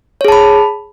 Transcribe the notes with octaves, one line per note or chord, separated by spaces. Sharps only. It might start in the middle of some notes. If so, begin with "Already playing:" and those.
G#4 C#5 A5 B5